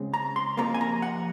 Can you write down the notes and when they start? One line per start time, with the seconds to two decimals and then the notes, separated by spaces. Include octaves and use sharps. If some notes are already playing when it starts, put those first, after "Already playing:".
Already playing: C#3 G#3 C4
0.14 A#5
0.36 C6
0.57 F2 C3 F3 A#3 A#5
0.74 G#5
0.81 A#5
1.02 F#5